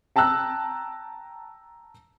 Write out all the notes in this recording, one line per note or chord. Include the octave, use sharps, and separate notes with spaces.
G5 A5 A#5 E6 F#6